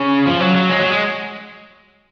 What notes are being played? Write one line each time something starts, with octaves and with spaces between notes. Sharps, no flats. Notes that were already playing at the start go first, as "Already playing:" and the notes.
Already playing: C#3
F3
F#3
F#3
G#3
F#3
G#3